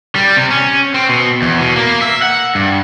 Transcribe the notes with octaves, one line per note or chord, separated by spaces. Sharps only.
G3
C3
C#4
C4
B2
E2
B2
A#3
E5
F#5
G2